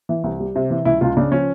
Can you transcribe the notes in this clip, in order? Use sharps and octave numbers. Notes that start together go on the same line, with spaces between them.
E3
C2
G3
C3
E3
C#2 E4
C#2 F4
C#3 D4
F3 C#4